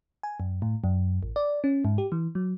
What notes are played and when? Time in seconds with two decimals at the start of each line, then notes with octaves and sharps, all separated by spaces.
0.23 G#5
0.40 F#2
0.62 A2
0.84 F#2
1.23 A1
1.36 D5
1.64 C#4
1.85 G#2
1.98 G4
2.12 E3
2.35 F#3